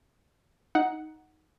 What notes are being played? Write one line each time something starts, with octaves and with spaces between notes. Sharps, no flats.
D#4 F#5